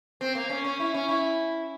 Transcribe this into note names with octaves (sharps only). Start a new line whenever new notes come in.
C4
A#3
C#4
C#4
E4
C#4
E4